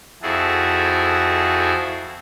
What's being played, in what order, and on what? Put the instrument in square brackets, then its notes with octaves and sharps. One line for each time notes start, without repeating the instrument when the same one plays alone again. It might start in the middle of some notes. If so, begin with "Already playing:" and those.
[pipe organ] F2 E4 F#4 G#4 A4